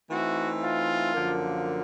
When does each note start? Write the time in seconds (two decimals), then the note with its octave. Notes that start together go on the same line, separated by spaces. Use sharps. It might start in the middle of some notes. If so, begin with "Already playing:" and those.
0.10 E3 A3 C4 D#4 F#4
0.63 F4
1.14 F#2 D3 F3 A#3